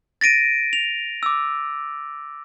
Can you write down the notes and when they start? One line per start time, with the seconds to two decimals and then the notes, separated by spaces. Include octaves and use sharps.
0.21 A6 A#6 D7 D#7
0.73 F7
1.23 D6 E6